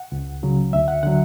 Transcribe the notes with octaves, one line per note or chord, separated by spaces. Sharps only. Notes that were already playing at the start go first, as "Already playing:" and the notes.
Already playing: F#5
C#2
C#3 F#3
D2 E5
F#5
D3 F#3 F#5